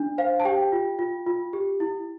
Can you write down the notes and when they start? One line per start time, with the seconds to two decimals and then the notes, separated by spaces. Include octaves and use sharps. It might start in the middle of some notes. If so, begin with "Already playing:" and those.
Already playing: D4
0.18 C5 F5
0.40 A5
0.45 G4 G5
0.72 F4
0.99 F4
1.27 F4
1.53 G4
1.80 E4